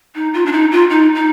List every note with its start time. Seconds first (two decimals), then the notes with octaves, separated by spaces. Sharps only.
0.15 D#4
0.34 F4
0.46 D4
0.53 D#4
0.72 F4
0.90 D#4
1.15 D#4